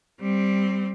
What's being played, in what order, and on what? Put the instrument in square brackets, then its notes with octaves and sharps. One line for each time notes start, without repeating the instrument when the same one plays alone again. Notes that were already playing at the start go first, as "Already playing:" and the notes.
[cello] G3 C4